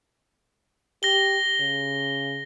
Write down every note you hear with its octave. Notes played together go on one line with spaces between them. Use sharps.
G4 A#6 G7
C#3